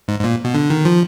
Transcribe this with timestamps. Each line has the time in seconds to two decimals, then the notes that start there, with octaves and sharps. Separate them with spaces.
0.08 G#2
0.20 G#2
0.24 A#2
0.45 B2
0.54 D3
0.70 D#3
0.85 F3